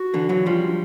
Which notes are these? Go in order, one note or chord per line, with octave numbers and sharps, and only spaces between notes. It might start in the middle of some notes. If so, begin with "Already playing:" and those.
Already playing: F#4
D3 E3
E3 F#3
F3 G3 F4
C#4
D4